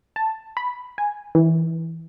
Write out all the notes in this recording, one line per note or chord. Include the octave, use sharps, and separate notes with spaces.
A5
B5
G#5
E3